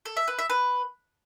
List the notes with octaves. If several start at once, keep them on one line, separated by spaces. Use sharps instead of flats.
A4
E5
B4
E5
B4